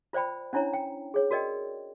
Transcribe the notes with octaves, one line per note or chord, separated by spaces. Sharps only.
F4 C5 D5 G5 B5
C#4 D4 E4 C#5 A#5
G5
G#4 C#5
F#4 A#4 D5 D#5 G5